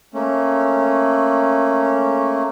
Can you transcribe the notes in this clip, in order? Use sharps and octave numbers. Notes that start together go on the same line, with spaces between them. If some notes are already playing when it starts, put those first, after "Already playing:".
A3 A#3 C#4